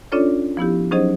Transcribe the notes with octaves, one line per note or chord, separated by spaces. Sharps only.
C#4 D4 F4 A4 C#5 D5
F3 B3 E4 G4
F#3 C#4 D#4 G#4 C5 D#5